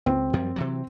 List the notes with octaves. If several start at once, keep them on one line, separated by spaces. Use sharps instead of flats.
C#2 C4
F#2 F3 G3
C3 E3 F#3